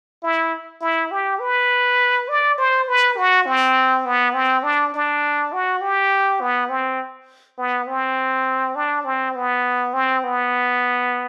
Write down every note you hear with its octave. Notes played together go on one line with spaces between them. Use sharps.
E4
E4
G4
B4
D5
C5
B4
F#4
C4
B3
C4
D4
D4
F#4
G4
B3
C4
B3
C4
D4
C4
B3
C4
B3